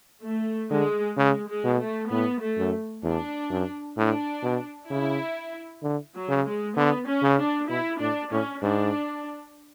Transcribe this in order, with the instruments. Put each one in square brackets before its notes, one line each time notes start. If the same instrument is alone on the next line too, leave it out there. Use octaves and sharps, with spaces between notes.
[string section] A3
[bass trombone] D3 [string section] G#3
[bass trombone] C#3 [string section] G#3
[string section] G#3
[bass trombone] B2
[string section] A3
[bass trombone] A2 [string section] B3
[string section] A3
[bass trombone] F#2
[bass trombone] E2 [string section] D4
[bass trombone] F#2
[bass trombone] A2 [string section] D4
[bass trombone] B2
[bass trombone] C#3 [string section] E4
[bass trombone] D3
[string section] F#3
[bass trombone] C#3
[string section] G#3
[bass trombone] D3 [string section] B3
[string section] C#4
[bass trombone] C#3
[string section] D4
[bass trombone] B2 [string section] E4
[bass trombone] A2 [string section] D4
[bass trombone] A2 [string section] C#4
[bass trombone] G#2 [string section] D4